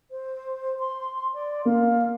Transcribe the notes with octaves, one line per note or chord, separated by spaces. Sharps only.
C5
C6
D5
A#3 F5